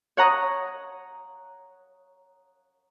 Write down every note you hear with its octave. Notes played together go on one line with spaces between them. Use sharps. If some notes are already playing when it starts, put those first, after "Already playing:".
C#5 F#5 A#5 D#6